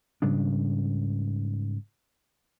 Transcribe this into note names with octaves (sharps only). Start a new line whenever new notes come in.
G#2 C#3 G3 D4